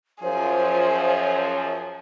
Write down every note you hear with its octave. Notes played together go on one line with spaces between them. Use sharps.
F#2 F3 G#4 C5 C#5